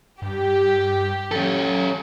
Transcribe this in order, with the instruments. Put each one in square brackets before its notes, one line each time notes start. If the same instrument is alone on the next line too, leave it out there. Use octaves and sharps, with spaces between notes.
[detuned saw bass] G2 [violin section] G4
[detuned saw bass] F#3 [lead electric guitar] C#4 A4